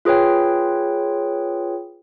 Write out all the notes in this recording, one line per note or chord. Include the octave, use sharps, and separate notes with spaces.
F4 G#4 B4 C#5 G5